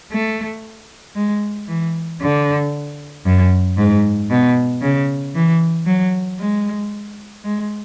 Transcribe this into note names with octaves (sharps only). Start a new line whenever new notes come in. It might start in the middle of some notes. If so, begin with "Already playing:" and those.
A3
G#3
E3
D3
F#2
G#2
B2
C#3
E3
F#3
G#3
G#3